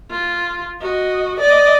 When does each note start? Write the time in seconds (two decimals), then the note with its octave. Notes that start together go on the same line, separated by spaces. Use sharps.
0.11 F4
0.81 F#4 D#5
1.40 D5 D#5